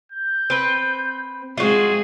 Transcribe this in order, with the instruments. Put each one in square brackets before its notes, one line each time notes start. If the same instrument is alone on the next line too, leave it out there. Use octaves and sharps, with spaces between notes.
[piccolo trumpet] G6
[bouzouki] C4 B4
[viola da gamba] G#3 C4 G#4 [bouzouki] F4 F#4